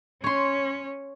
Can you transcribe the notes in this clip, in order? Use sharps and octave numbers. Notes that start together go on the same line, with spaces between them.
C#4 C#5 C6